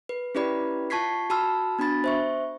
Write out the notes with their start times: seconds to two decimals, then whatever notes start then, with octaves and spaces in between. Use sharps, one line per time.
0.09 B4
0.35 C#4 E4 G4 B4 D5 B5
0.90 F4 A5 C#6 G#6 B6 C7
1.30 F#4 A5 B5 E6 F6
1.79 B3 D4 F#4 B5 A6
2.04 C5 E5 C#6